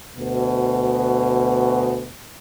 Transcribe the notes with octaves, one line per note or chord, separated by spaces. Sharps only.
D2 B2